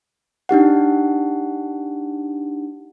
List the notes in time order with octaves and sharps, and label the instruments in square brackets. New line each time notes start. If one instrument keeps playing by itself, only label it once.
[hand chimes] D4 D#4 G4 F#5